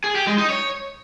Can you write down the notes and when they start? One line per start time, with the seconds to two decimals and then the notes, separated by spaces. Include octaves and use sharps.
0.04 G#4
0.15 G4
0.27 G#3
0.38 D#4
0.50 C#5